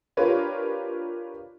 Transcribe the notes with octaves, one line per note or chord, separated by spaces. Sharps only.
D4 F4 G4 A#4 B4 C#5